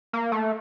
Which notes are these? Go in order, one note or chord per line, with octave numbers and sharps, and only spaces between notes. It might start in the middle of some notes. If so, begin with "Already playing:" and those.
A#3
A3